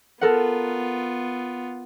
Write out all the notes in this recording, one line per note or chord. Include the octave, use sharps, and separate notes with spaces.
B3 F4 A4 A#4 F#5